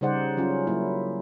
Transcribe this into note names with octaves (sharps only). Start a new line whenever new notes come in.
C#3 G3 D#4 C5 D5 F#5
F#3 C#4 F4
F#3 A#3 E4